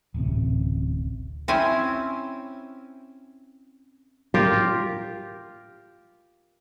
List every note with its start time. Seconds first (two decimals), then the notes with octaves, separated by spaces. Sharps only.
0.14 D1 A1 C3
1.48 C4 C#4 E4 G#5
4.34 F4 G4 A#4